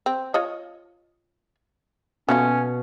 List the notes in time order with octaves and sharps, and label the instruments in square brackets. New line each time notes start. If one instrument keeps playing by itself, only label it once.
[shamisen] C4
F4 C#5 D#5
[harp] B2 [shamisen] F#3 A3 F4 [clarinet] C#4